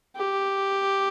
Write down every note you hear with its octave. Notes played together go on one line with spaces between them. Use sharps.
G4